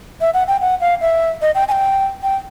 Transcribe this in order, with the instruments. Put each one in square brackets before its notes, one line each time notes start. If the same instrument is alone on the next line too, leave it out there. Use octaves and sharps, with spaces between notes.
[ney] E5
F#5
G5
F#5
F5
E5
D#5
G5
G#5
G5
G5